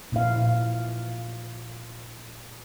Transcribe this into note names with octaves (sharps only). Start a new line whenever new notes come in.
A#2 E4 F5